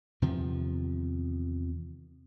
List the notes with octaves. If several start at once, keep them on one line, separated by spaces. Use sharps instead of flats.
E2 C3 D#3 F3